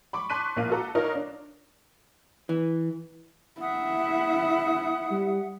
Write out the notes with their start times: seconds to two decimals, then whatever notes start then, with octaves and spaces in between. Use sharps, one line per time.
0.13 B5 C#6 D6
0.30 A5 C6 C#6 F#6 B6 D#7
0.56 A#1 A#3 F5 D6 F#6 D#7
0.70 F#4 A4 A#5
0.95 D#4 F4 A#4 C#5
1.15 D4
2.49 E3
3.61 E4 E5 F#5 D#6
5.11 G3